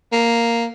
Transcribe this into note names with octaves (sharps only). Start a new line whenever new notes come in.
A#3